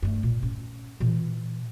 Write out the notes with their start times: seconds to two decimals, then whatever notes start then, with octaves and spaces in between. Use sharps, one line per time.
0.02 G2 A3
0.23 A#2
0.43 C#4
1.00 A#2 E3